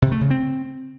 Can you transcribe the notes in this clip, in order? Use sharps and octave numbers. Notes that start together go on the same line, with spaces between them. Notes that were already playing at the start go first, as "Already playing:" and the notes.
C3
A3
C#3
C4